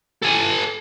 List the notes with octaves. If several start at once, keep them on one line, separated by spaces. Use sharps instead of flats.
A4 G#5